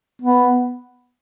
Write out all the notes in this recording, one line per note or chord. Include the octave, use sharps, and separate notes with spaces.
B3